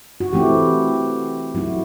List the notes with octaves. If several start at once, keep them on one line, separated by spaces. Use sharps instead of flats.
F#4
E3 A3 C4 E4 G4
F#3 A3 C4 E4 F#4